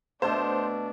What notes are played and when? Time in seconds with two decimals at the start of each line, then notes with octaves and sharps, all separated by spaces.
0.22 B2 A3 D4 C5